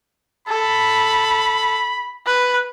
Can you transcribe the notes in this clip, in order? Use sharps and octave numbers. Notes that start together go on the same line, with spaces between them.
A4 B5
B4